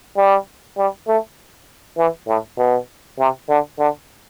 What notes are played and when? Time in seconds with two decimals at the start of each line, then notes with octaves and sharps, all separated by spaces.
0.17 G3
0.78 G3
1.08 A3
1.98 E3
2.27 A2
2.58 B2
3.19 C3
3.49 D3
3.78 D3